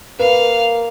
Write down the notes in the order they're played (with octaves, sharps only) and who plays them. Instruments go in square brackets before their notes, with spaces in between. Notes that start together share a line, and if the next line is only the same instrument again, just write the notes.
[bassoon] A#3 [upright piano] B4 [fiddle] F5